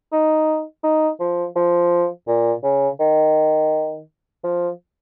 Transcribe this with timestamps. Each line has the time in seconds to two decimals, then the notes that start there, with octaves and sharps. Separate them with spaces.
0.12 D#4
0.84 D#4
1.20 F3
1.56 F3
2.28 A#2
2.64 C#3
3.00 D#3
4.44 F3